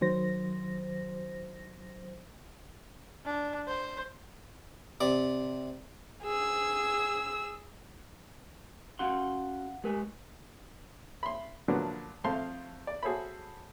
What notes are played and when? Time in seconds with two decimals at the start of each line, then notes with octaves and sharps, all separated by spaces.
0.01 D#3 F#3 C5 A#6
3.25 D4
3.67 C5
5.01 C3 D5
6.23 G#4 E6
8.99 C#4 F#4 F5 F#5 C6
9.84 G#3 G4 A#4 B4 G#5
11.23 B5 C6
11.68 A#2 D3 F3 F#3 B3 D4
12.24 F2 A3 C5 F5 A5 C6
12.87 D5
13.03 F#4 G#4 A4 C5 C#5 B5